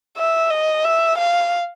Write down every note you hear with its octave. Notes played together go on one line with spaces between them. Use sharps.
E5
D#5
E5
F5